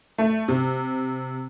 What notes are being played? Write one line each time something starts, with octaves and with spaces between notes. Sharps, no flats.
A3
C3